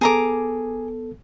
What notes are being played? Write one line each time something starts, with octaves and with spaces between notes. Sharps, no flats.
B3 G#4 A4 A#5 D6